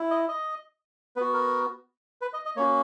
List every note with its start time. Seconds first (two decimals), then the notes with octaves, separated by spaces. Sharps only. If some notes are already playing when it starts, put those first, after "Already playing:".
Already playing: E4
0.11 D#5
0.28 D#5
1.16 B3 F#4 B4
1.34 A#4
2.21 B4
2.33 D#5
2.45 D#5
2.56 A#3 C#4 F#4 C#5